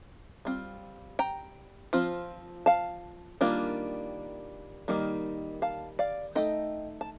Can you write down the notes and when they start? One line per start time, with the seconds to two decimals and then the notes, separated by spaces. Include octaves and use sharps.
0.45 G3 C4 F4
1.19 G5 A#5
1.93 F3 C4 F4
2.66 F5 A5
3.41 D#3 G3 A#3 D4 F4
4.88 D#3 G3 A#3 D#4
5.62 F5 A5
5.99 D5 F5
6.35 A3 D#4 D#5 G5
7.01 A5